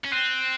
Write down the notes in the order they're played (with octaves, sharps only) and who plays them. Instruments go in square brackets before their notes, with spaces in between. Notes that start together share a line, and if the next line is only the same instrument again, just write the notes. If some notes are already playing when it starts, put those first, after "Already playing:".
[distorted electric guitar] C#4
[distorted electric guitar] C4 [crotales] F#6 C7 D#7